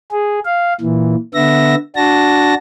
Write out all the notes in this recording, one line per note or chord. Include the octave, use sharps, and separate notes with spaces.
G#4
F5
A#2 E3
D3 B3 E5 A#6
D4 F#4 A5 A#6